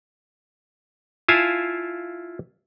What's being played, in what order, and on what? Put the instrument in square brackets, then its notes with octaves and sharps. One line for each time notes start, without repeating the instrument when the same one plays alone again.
[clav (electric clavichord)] E4 F4 F5 G#5 A5